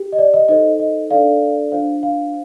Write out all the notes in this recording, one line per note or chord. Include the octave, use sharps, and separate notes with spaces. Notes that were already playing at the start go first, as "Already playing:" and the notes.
Already playing: G4
D#5
D5
D#5
D#4 A4 C5 D#5
D#5
D4 A4 D5 F5
D4 F4 C5 F5
F5